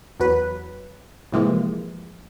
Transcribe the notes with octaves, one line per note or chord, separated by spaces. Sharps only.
E2 F#3 B4
A2 C3 E3 F3 G#3 A#3